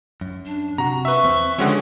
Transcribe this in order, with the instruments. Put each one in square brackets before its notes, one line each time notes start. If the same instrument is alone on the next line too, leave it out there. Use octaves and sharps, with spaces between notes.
[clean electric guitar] F#2
[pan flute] D4
[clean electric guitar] C3 F#4 [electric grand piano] A#5
[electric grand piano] B4 E5 [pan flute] C#6
[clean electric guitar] E2 C4
[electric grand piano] D3 G#3 C#4 [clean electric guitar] F3 F#4 G4 [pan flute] F#5